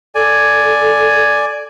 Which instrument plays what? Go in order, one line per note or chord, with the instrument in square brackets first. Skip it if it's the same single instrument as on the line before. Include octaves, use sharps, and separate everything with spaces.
[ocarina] A4 [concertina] D5 G#5